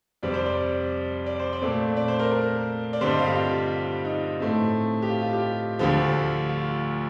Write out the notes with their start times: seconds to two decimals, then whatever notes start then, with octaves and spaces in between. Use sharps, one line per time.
0.23 F2 C3 G3 C4 D5
0.34 C5
0.46 D5
1.26 D5
1.39 C5
1.53 D5
1.62 A#2 A3 C4
1.96 D5
2.08 C5
2.19 A#4
2.31 A#4
2.93 D5
3.01 G2 D3 G3 C4 C5
3.10 D#5
3.19 F5
3.27 G4
3.35 F4
4.05 D#4
4.40 A2 A3 C4
5.02 G4
5.09 F4
5.21 F4
5.33 G4
5.79 D2 D3 F3 G4
6.49 F4